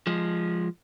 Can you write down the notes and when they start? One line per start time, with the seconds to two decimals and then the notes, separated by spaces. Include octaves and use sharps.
0.07 F3 G#3